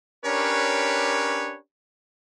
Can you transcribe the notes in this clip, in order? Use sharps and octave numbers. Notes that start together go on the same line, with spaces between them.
C#4 D4 G4 A#4 B4 C#5